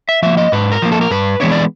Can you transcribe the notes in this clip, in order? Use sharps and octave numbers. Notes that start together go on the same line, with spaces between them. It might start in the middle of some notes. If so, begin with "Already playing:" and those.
E5
F3 A#3 E5
D#5
G#2 B4
A#4
F3 A#3
A4
A#4
G2 B4
E3 G#3 B3 D4 C#5
D5